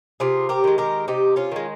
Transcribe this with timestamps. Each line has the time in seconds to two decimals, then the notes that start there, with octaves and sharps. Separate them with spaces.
0.20 C3 F4 G#4
0.49 G4 A#4
0.64 D#3 G#3
0.78 G4 A#4
1.08 C3 D#4 G4
1.36 C#4 F4
1.51 D#3 G#3